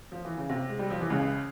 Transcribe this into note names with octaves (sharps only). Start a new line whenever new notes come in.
F3
E3
C#3
C3
G#3
G3
F3
E3
C#2 C#3